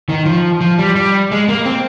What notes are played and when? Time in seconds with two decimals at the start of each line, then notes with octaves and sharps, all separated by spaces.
0.09 D#3
0.25 F3
0.61 F3
0.78 G3
0.95 G3
1.32 G#3
1.49 A#3
1.66 C4